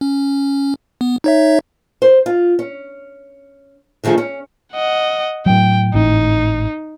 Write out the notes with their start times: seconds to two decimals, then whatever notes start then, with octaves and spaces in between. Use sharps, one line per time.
0.01 C#4
1.01 B3
1.24 D#4 C#5 E5
2.02 C5
2.26 F4
2.59 C#4
4.04 D3 D#3 F3 A3 G#4
4.18 C#4
4.73 D#5 F#5
5.46 A2 F#3 G5
5.94 G#1 A2 D#4